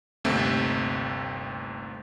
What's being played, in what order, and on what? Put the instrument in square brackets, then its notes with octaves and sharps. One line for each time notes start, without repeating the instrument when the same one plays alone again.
[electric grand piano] G1 D#2 C3 A3 C4 E5